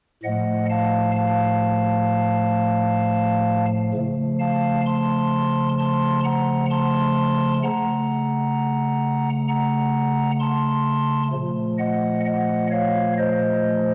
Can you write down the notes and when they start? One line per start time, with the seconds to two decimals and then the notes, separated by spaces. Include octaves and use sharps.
0.23 A2 F3 A3 D#5 F#5
0.70 F5 A5
1.16 F5 A5
3.94 C#3 F3 A3
4.39 F5 A5
4.85 A5 C6
5.79 A5 C6
6.24 F#5 A#5
6.70 A5 C6
7.63 C#3 A3 F#5 A#5
9.48 F#5 A#5
10.40 A5 C6
11.32 A#2 F3 A3
11.78 D#5 F#5
12.25 D#5 F#5
12.71 C#5 F5
13.18 C5 D#5